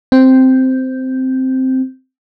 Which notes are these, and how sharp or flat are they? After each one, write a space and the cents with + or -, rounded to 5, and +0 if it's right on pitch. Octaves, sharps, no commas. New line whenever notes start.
C4 -5